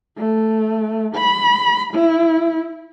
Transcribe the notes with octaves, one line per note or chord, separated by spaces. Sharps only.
A3
B5
E4